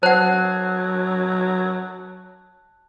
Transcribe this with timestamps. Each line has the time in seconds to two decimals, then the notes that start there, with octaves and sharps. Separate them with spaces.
0.03 F#3 C5 F#5 A5 F#6